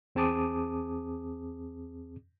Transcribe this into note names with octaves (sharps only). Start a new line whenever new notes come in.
E2 C4 G#4 A5 D6 D#6